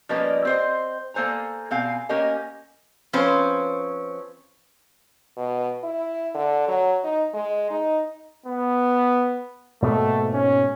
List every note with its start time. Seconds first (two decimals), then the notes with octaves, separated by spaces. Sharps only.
0.09 F3 G3 A#3 C#4 B4 D#5
0.45 C4 C5 D#5
1.14 A#3 A4 C5 G#5 A#5
1.71 B2 C4 F5 G#5
2.09 A#3 C#4 G4 A#4 D#5 G#5
3.13 F3 C4 C#4 B4 C5
5.37 B2
5.84 E4
6.34 D3
6.68 F#3
7.03 D#4
7.34 G#3
7.70 D#4
8.46 B3
9.82 G#2 B2 A3 A#3
10.33 C#4